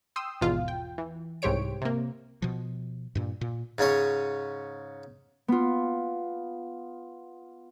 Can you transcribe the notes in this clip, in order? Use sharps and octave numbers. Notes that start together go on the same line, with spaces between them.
G5 C6 D#6 E6
G#1 E2 B2 F4 F5
G5
E3
C2 G#2 G4 C5 C#5 D7
C3 A#3
B2 F3
G2 A#2
A#2
G#2 C#3 C#4 C#5
B3 F4